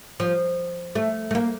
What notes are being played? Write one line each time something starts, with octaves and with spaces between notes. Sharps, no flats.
F3
A3
A3
A#3